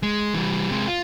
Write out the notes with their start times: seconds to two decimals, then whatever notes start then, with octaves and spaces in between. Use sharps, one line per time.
0.03 G#3
0.34 E3 G3
0.70 C3 G#3
0.88 F4